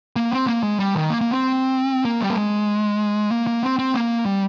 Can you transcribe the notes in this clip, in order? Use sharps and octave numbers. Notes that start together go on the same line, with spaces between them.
A#3
C4
A#3
G#3
G3
D#3
A#3
A#3
C4
A#3
G3
A#3
G#3
A#3
A#3
C4
C4
A#3
G3